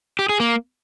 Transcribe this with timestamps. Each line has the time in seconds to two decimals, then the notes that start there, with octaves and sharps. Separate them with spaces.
0.19 G4
0.29 G#4
0.40 A#3